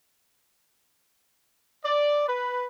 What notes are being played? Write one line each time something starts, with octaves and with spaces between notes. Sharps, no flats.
D5
B4